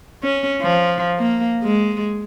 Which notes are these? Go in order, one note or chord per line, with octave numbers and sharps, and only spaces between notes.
C#4
F3
A#3
G#3